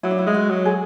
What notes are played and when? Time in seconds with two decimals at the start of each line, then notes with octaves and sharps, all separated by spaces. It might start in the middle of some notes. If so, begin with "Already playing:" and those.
0.03 F#3 E4
0.11 D4
0.18 E4
0.27 G#3
0.34 F#4
0.50 F#3
0.65 G#4